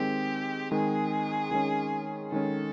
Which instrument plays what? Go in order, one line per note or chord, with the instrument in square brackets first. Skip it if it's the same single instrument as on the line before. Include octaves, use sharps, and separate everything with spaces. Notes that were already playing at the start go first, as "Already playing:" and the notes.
Already playing: [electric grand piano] D#3 G#3 C4 [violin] G4
[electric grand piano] D#3 G#3 C4 [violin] G#4
[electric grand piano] D#3 G#3 C#4
[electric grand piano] D#3 G#3 C#4 [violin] A4